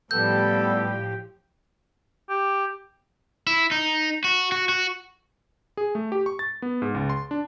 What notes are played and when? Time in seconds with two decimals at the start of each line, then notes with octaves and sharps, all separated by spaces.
0.11 A2 F3 G3 B3 G4 A4 G6
2.30 G4
3.47 E4
3.71 D#4
4.24 F#4
4.52 F#4
4.69 F#4
5.77 G#4
5.95 A3
6.12 G4
6.26 C#6
6.39 A6
6.62 B3
6.82 G#2
6.95 C#2
7.10 C6
7.31 D4